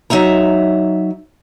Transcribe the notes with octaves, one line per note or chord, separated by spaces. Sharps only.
F#3 D#4 E5 A#5